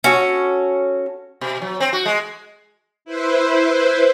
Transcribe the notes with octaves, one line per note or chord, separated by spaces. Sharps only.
C#4 F#4 A4
B2
F#3
C4
F#4
G#3
E4 B4 C5